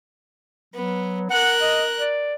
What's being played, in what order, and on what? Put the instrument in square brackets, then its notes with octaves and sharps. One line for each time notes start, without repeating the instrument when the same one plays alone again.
[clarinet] F#3 [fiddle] B3
[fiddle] A#4 F#6 [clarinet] F#5
[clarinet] D#5
D5